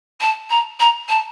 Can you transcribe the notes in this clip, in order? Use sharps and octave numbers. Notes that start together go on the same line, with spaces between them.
A5
A#5
A#5
A5